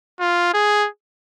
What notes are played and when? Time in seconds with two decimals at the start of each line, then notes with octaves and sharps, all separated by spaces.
0.20 F4
0.53 G#4